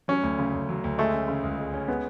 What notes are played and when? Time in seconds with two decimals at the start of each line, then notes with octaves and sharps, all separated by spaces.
0.08 F#3 C#4
0.23 D2
0.39 C#3
0.54 D2
0.69 F#3
0.84 D2
0.98 G#3 A3
1.13 C#4
1.28 C#3
1.44 C#2
1.59 G#3
1.73 C#4
1.88 G#3 B3